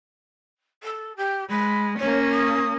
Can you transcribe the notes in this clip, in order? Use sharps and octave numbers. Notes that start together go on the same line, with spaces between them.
A4
G4
G#3 B5
A#3 C#4 C#5
D#6